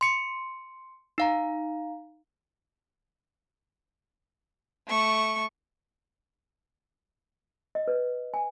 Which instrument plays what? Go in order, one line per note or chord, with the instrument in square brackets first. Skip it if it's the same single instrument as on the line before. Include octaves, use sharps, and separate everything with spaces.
[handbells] C6 C#7
D#4 F5 A#5
[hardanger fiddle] A3 C#6
[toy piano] D#5
B4
G#5